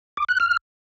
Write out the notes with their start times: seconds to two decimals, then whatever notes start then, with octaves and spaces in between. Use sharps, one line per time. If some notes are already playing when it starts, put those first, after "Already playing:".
0.17 D6
0.29 F#6
0.40 F6